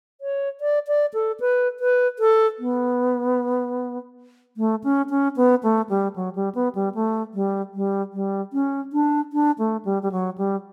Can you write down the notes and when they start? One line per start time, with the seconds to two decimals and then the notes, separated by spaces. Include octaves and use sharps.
0.21 C#5
0.61 D5
0.88 D5
1.14 A4
1.40 B4
1.80 B4
2.19 A4
2.59 B3
4.57 A3
4.84 C#4
5.10 C#4
5.37 B3
5.63 A3
5.89 G3
6.16 F#3
6.35 G3
6.55 B3
6.75 G3
6.95 A3
7.34 G3
7.75 G3
8.13 G3
8.53 C#4
8.93 D4
9.33 D4
9.58 A3
9.85 G3
10.03 G3
10.12 F#3
10.38 G3